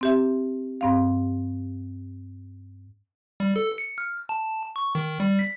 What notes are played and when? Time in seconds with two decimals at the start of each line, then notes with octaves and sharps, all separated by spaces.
0.01 C4 G4 E5
0.81 G2 C4 F5
3.40 G3
3.56 A4
3.78 C#7
3.98 F6
4.29 A5
4.76 C#6
4.95 D#3
5.20 G3
5.39 B6